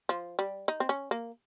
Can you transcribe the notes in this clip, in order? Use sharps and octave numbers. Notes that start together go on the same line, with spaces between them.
F3
G3
D#4
C4
C#4
A#3